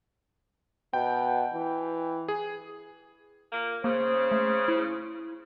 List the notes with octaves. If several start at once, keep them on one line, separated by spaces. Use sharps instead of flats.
B2 G5
E3
G#4
A#2 A#3
C#3 A#3 C5
A3
E4